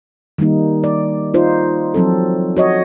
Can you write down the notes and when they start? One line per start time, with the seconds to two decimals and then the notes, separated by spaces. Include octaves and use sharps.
0.38 D#3 G3 A#3 D#4
0.84 D5
1.34 D#4 F4 C5
1.94 F3 F#3 C4 A4
2.56 F#4 C#5 D#5